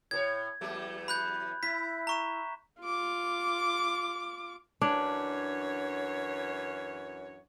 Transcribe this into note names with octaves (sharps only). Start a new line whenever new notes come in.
A2 A4 C#5 G#6
E2 F#3 A3
B5 F#6 G6
E4 B6
A#5 C#6 E7
F4 D6
F#2 E3 D4 C#5